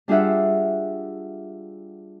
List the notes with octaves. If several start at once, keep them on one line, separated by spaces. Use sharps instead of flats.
G3 D4 F4 G#4 E5 F#5